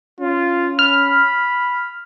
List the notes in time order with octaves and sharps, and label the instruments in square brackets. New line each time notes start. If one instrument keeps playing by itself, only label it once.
[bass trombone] C#4 [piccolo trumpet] F4
[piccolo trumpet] B5 [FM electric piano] F6